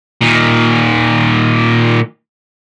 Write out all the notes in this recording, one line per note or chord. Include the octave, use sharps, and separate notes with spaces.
A#2 D#3